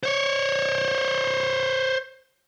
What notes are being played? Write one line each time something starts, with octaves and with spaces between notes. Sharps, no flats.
C5 C#5